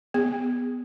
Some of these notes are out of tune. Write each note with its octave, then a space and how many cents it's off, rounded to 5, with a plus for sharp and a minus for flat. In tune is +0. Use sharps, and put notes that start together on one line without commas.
B3 +0 G#4 -20